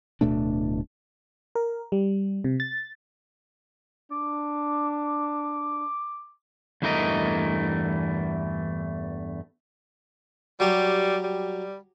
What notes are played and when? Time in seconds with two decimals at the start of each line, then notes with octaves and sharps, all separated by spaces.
0.21 D1 B2 A3 D4
1.55 A#4
1.92 G3
2.44 C3
2.60 A6
4.12 D4 D6
6.82 E2 G2 E3 A3 A#4 D#5
10.60 F#3 G3 G4
11.23 G3